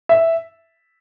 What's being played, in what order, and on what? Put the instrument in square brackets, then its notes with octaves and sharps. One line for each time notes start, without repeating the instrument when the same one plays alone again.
[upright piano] E5